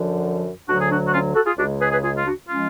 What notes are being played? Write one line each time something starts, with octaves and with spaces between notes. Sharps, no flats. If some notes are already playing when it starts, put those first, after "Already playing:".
Already playing: F#2 D3 F3
D2 D3 F#3 D4 F#4
G#4
D4 F#4
F#4
C#4 F4
F#4 A4
F4 G#4
C#2 C#3 G#3 D4 F#4
G#4 B4
G#4 B4
F4 G#4
F4
D4 F#4
F3 G#3 C#4 F4